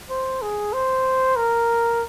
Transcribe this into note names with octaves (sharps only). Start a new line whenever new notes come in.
C5
G#4
C5
A#4